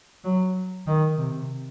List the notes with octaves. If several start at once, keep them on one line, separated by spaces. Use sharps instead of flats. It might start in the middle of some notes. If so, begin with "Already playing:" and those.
F#3
D#3
C3